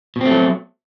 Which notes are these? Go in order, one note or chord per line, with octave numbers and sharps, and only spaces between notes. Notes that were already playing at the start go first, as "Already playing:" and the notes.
B2 F#3 A3 C4